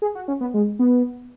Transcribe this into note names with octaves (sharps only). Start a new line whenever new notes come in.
G#4
F#4
C#4
B3
G#3
B3